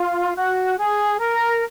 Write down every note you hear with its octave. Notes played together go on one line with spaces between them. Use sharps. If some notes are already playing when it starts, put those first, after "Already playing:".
Already playing: F4
F#4
G#4
A#4